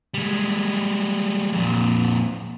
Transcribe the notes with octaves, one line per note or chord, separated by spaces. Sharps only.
G3 G#3
F2 A#2